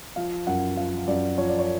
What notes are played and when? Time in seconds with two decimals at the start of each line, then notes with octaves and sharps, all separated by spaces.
0.16 F3 F5
0.47 F#2 F#5
0.77 F3 F5
1.07 F#2 D5
1.38 F3 C#5
1.49 D5
1.59 C#5